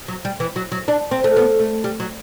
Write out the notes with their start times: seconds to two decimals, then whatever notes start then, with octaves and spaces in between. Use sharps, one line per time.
0.08 F#3
0.25 G3
0.40 E3
0.56 F#3
0.72 F#3
0.88 D4
1.11 C4
1.24 A3
1.37 B3
1.59 A3
1.84 G3
2.00 F#3